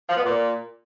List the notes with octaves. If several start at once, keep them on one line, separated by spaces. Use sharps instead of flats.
F3
B3
A#2